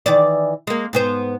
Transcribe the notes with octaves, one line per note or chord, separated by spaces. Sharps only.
D#3 E3 D5
G#3 A#3
G#2 B3 C5